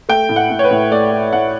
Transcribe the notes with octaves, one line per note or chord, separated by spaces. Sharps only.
A3 G5
A2
F#5
A2
C#5
B4
A2
A3 D5
A3
A2 F#5